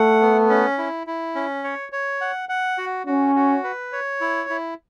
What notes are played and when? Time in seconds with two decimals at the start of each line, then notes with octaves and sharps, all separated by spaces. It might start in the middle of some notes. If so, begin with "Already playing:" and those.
Already playing: A3 F#5
0.21 B3
0.49 C#4
0.78 E4
1.07 E4
1.35 C#4
1.64 C#5
1.92 C#5
2.21 F#5
2.49 F#5
2.78 F#4
3.07 C#4 F#4
3.35 F#4
3.64 B4
3.93 C#5
4.21 E4
4.50 E4